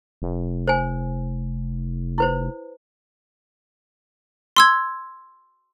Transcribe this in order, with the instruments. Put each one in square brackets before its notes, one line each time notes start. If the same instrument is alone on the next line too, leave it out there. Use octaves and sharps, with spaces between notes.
[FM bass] F1
[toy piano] C5 G#5
E4 B4 C5
[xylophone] C6 E6 G#6